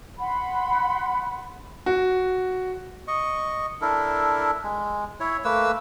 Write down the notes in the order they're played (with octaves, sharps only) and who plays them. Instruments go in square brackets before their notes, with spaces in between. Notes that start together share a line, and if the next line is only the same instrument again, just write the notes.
[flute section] F#5 B5 C6
[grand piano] F#4
[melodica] D#5 C#6
D4 E4 A4 A#4
G#3
E4 C#5
A3 A#3 B4 E6